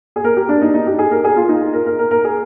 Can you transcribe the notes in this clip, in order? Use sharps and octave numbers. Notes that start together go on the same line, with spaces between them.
G#4
A#4
G4
D4
D#4
D#4
G4
G#4
A#4
G#4
F4
D#4
A#4
A#4
A#4
A#4
G#4